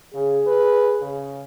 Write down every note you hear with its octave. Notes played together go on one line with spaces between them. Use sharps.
C#3 G#4
B4
C#3